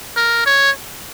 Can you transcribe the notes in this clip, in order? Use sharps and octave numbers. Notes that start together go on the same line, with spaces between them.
A#4
C#5